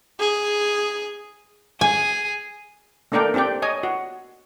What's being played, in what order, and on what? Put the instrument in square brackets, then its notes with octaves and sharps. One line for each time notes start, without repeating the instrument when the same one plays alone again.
[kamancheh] G#4
[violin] G#4 [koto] G#5
[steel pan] A3 A#3 D4 A#4 D5 G5
C4 D4 G4 D5 G5
C#5 D#5 G#5
F#4